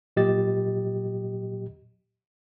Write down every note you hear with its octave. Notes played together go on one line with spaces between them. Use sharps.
A#2 F#3 G4 D#5 A6